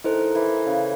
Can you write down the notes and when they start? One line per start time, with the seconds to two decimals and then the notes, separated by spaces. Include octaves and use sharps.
0.04 D#3 E4 A4 C5
0.35 E3
0.66 C#3